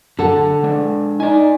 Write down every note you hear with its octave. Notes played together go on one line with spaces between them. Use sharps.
D3 A4 F#5
G#3 D4
D#4 D5 G#5